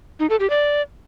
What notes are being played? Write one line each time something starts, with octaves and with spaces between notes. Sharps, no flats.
D#4
A4
G4
D5